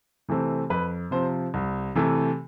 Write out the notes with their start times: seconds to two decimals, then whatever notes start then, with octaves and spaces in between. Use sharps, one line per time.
0.28 C3 E3 A3 C4
0.70 F2 B4
1.11 C3 F3 C4 C5
1.54 C2
1.95 C3 E3 A3